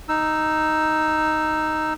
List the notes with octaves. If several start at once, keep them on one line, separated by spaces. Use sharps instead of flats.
D#4 E6